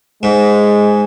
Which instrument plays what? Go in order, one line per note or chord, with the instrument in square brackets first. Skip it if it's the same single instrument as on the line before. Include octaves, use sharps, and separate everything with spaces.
[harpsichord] G#2 [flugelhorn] G#3